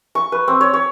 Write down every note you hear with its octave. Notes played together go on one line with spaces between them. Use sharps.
C#6
B4
C4
C#5
C#5